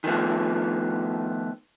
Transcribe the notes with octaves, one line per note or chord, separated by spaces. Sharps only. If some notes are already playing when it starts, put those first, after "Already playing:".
D#3 F3 A3 B3